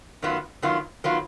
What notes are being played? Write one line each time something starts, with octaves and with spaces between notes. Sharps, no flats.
F#2 D#3 F#3 B3 F4
F#2 D#3 F#3 B3 F4
D#3 F#3 B3 F4